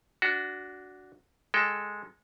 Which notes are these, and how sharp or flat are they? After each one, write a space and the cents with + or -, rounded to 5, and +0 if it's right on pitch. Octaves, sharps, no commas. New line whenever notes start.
D4 -15 F#4 +0
G#3 +0 A4 +0 G5 +0